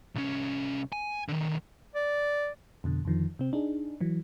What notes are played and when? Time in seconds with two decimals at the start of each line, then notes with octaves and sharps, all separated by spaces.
0.15 C2 C#4
0.92 G#5
1.29 D3 D#3
1.95 D5
2.84 F2 B2 D3
3.05 F2 D3 D#3 F3
3.39 C3 C4
3.53 D4 D#4 G#4
4.01 E3 F#3